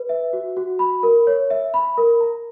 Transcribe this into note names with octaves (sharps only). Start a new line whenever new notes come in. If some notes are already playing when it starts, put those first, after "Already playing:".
Already playing: B4
E5
F#4
F#4
B5
A#4
C#5
E5
B5
A#4
A#5